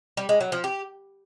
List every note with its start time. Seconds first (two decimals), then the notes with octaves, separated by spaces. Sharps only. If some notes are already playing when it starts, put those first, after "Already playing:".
0.17 G3
0.29 G#3
0.41 F#3
0.52 F3
0.64 G4